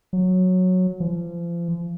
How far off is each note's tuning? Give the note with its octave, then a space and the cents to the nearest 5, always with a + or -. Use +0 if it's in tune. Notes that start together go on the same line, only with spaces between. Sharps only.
F#3 -10
F3 -35